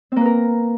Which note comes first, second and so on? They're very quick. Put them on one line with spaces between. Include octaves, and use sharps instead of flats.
C4 A#3 B4 A#4